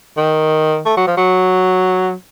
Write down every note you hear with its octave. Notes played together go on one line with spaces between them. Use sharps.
D#3
A3
F#3
F3
F#3